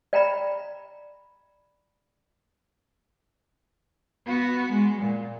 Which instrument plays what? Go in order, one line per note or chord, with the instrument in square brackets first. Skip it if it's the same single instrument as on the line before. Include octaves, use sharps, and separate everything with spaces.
[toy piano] D5 G5 A#5 B5
[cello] B3 F#4
G#3
A#2